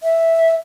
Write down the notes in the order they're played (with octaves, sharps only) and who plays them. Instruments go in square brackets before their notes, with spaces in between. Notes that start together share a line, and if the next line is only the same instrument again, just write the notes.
[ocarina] E5